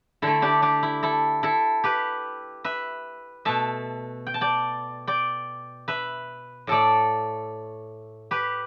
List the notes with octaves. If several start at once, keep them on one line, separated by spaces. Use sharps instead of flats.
D3 A3 E4 A4
D4 G4
D4 G4
E4
E4 A4
E4 A4
G4 B4
B4 E5
B2 A3 E5 A5
G5
A5
D5 G5
D5 G5
B4 E5
A2 A3 A4 D5
G4 B4